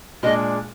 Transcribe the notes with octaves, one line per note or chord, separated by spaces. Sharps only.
A#2 G#3 D4 D#5